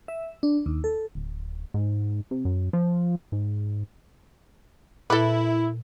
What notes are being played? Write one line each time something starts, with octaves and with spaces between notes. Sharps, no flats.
E5
D4
D#2
A4
D1
G#2
C3
F#2
F3
G#2
A#2 E4 A4 B4